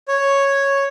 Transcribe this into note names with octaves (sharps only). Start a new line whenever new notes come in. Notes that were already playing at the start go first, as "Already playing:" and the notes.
C#5